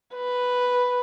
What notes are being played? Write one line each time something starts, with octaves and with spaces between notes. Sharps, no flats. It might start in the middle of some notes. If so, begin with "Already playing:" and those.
B4